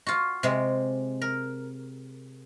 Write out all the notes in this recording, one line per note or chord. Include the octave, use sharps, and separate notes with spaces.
F4 F#4
C3 G#3
A#4